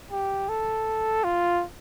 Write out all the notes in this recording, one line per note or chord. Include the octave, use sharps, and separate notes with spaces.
G4
A4
F4